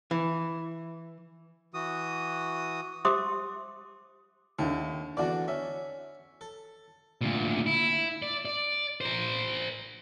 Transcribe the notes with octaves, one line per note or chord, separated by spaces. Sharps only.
E3
E3 F#4 D#6
G4 C5 E5 C6 D6 D#6
D#2 D3 E4
E2 D3 D4 F#4 D5
C#4 E5
A4
D2 A#2
E4
D5
D5
A#4 C5